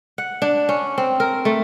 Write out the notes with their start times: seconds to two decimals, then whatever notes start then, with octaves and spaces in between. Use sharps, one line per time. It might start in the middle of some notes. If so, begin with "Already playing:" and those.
0.18 F#5
0.42 D4
0.69 C#4
0.98 C4
1.20 A#4
1.45 A3